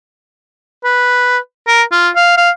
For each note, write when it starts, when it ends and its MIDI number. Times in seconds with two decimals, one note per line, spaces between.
0.84 1.38 71
1.68 1.82 70
1.92 2.09 65
2.16 2.35 77
2.37 2.50 77